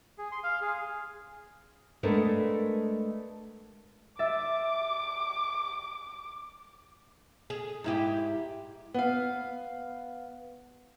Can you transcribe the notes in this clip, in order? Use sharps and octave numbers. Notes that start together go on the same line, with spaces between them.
G#4
C6
F5
G#4
G#3 A3 B3 D4 A4 A#4
E5 D6 A6
G#4
G#2 E4 G4
B3 F5